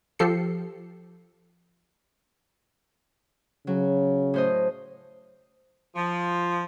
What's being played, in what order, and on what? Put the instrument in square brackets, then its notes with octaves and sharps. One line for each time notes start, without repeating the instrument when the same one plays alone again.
[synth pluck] F3 G4 A4 C7 C#7
[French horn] C#3 [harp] F#3
[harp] A2 C5 D#5
[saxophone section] F3